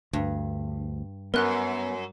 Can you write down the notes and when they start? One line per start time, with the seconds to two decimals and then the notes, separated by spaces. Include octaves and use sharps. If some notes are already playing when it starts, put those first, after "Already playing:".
0.13 D2 G2
1.34 F#2 B3 A#4 F#6 G7